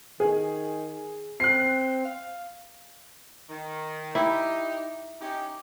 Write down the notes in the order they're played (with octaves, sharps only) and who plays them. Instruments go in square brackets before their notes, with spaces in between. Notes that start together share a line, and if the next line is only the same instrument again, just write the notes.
[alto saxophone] D#3 [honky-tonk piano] G#4
[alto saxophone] C4 [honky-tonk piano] F#6 C7
[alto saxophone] F5
[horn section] D#3
[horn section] D#4 G4 [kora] E4
[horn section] C#4 D#4 G4